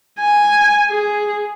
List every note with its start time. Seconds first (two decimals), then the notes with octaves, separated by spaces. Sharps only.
0.20 G#5
0.90 G#4